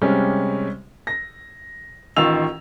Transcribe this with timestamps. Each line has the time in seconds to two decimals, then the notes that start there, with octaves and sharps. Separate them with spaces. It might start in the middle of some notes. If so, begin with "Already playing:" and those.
0.02 C3 G3 G#3 C#4
1.07 A#6
2.16 A1 D#3 F4 F5 E6 F7